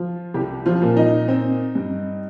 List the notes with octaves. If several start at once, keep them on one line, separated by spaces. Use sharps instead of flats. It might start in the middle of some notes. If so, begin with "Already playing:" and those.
Already playing: F3 F4
C2 G3 G4
F3 F4
A#2
D#4
C4
G2